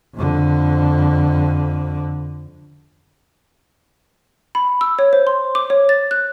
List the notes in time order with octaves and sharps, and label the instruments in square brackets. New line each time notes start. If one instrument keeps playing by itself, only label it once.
[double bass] F2 D3
[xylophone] B5
E6
C#5
C5
C6
D6
C#5
A6
F#6